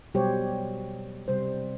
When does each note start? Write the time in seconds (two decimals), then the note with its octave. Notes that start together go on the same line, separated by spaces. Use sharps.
0.14 B2 F#3 G3 G4 C5 C#5
1.28 C3 G3 C5